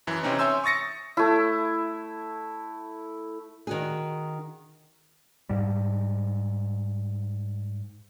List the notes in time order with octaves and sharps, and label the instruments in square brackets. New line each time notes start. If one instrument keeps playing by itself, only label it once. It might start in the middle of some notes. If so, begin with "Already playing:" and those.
[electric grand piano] F#2 E3
C3 E3 C4 C#4 D#4
C#5 E5 G#5 C6 E6 G6
C#6 D#6 A6 A#6 C#7
[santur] A3 E4
[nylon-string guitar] D#3 F#4 G#4
[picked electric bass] G#2 G3